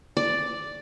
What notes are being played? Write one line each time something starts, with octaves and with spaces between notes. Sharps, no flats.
D5